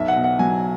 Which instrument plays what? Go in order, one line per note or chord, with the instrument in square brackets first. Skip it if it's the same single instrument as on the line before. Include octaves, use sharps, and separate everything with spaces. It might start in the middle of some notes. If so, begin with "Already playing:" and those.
Already playing: [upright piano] B1 [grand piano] E5
[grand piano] F#5
[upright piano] B2
[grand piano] F#5
[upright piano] F#3 [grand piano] G#5